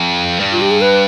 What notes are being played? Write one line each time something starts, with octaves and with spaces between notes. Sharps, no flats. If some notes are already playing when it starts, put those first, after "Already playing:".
Already playing: F2
G2
F4
G4
G#4
B4